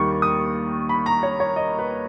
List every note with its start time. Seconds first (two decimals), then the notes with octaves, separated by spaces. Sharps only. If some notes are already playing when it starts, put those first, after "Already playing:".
Already playing: D#2 D#3 G3 C#6
0.22 D#6
0.89 B5
1.06 A#5
1.23 C#5
1.40 C#5
1.56 D#5
1.79 B4